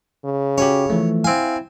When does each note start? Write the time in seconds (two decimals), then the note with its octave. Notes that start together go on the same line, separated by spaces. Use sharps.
0.25 C#3
0.58 C#4 F#4 G4 C#5
0.90 E3 F3 A3
1.24 C4 E4 F5 G#5